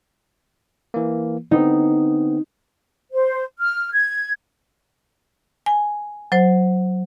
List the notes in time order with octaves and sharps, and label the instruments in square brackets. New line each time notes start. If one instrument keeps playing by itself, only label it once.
[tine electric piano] E3 A#3
[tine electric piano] D3 B3 C4 [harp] D#4
[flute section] C5
F6
G#6
[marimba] G#5
F#3 C5